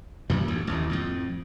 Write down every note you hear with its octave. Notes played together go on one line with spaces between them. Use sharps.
F#2 A#2 D#3 G3
A1 D2
A1 D#2 A2
F2 A2